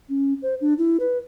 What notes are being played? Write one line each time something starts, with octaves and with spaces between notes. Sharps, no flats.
C#4
C5
D4
E4
B4